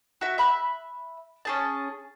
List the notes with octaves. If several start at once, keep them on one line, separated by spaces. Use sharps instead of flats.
F#4 E5
E5 B5 F#6
C#4 G#4 A5